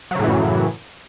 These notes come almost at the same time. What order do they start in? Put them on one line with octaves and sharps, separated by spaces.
F#3 C#3 A2 E3 F#2